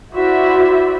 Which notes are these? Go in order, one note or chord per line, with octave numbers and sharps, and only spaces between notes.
E4 F#4 C5 D5 E5